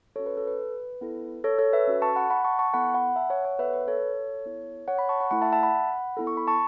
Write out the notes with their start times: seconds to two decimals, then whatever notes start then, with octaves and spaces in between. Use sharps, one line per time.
0.16 C#4 F#4 A4 C#5
0.26 B4
0.37 A4
0.47 B4
1.01 B3 E4 A4
1.44 A4 C#5
1.59 A4 C#5
1.73 B4 E5
1.87 C#4 F#4 A4
2.02 A5 C#6
2.16 F#5 B5
2.30 F#5 B5
2.45 A5 C#6
2.59 A5 C#6
2.73 B3 E4 A4 F#5 B5
2.94 F#5 B5
3.16 E5 A5
3.30 C#5 F#5
3.45 C#5 F#5
3.59 B3 A4 B4 E5
3.73 B4
3.88 A4 C#5
4.45 B3 E4 A4
4.88 C#5 F#5
4.98 F#5 B5
5.09 A5 C#6
5.20 F#5 B5
5.31 A3 E4 A4 F#5 B5
5.42 E5 A5
5.52 E5 A5
5.63 F#5 B5
6.17 B3 E4 A4
6.27 C#6
6.37 B5
6.47 A5 C#6